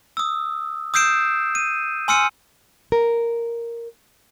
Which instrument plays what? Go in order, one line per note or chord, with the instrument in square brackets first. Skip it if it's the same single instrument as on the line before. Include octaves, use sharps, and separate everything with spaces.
[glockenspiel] D#6 E6
D#6 E6 G6 C7 D7 E7
D#7
G#5 C6 E6 F6 C#7 D#7
[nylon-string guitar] A#4